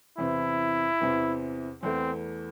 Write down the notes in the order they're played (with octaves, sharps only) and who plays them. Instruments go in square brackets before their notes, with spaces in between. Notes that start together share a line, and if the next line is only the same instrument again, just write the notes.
[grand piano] E2 C3 E3 C4 [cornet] E4
[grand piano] E2 C3 E3 C4
[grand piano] E2 E3 A3 [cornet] C4